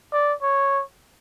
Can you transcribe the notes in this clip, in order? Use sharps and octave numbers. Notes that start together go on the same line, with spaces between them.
D5
C#5